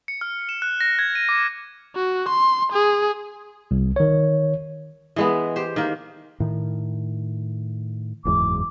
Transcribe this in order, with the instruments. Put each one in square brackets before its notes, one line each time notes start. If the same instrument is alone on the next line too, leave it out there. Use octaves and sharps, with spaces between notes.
[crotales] C#7
F6
E7
F#6
A#6
G#6
D#7
D6
[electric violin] F#4
C6
G#4
[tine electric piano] C2
D#3 C#5
[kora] E3 G#3 B3
G4 C5
D#3 A#3
[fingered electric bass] A2 D#3
[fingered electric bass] F#1 E2 G#2 [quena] D6